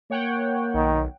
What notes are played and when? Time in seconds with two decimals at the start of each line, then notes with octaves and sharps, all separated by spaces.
0.11 A#3 C#5 F#5 G5
0.74 B1 D#3